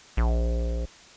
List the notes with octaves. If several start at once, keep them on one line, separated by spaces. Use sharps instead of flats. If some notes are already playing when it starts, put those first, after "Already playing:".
A#1